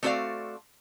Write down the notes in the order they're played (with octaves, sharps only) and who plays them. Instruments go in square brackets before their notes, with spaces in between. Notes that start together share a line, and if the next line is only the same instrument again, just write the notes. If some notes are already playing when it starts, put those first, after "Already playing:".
[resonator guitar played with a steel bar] A3 C4 F#4 C5 D5 F5